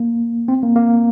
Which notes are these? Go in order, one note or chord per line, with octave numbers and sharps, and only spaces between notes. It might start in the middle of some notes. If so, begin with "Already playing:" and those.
Already playing: A#3
C4
A#3
A#3